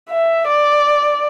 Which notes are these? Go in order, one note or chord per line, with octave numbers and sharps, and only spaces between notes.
E5
D5